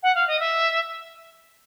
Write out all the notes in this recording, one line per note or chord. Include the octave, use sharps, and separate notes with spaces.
F#5
F5
D#5
E5